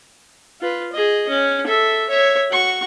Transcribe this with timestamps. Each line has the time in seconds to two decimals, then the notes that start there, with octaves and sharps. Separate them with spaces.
0.61 F4 B4
0.93 G#4 D#5
1.29 C#4
1.67 A4 E5
2.09 C#5 E5
2.51 F#4 C#6